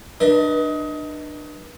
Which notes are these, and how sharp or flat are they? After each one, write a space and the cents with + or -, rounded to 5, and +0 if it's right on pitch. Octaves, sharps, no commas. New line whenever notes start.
D4 +30 B4 -35 D#5 +25